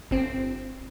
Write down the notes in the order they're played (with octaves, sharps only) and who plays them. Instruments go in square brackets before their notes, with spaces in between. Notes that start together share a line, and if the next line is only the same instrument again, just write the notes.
[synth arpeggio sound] G1 C4